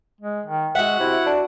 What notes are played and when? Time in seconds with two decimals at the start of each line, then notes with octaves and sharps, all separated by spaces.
0.21 G#3
0.46 D#3
0.75 G#3 F#4 E5 F#5
1.00 C3 E4
1.26 D4